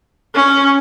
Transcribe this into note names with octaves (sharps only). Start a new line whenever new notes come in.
C#4